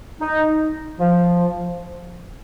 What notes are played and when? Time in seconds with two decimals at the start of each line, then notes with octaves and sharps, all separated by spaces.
0.21 D#4
1.00 F3